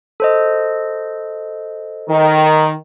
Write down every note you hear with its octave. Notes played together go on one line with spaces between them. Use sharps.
A4 C5 D#5
D#3